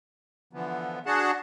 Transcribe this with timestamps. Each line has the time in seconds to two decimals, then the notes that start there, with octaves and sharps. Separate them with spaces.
0.53 D3 E3 F3 B3
1.06 D4 F#4 G#4 F#5 A5